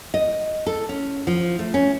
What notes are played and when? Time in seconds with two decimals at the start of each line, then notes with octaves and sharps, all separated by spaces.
0.14 D#5
0.67 A4
0.89 C#4
1.27 F3
1.59 A3
1.74 C#4